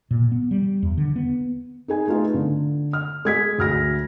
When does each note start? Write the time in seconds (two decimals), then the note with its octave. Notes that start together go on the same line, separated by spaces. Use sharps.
0.11 A#2
0.32 B3
0.51 G3
0.83 E2
0.97 D3
1.16 B3
1.88 D#4 G#4 G#5
2.08 A3 D#4 F4 B4
2.34 D3
2.93 F6
3.25 G#3 G#6 B6
3.58 D2 F6 A#6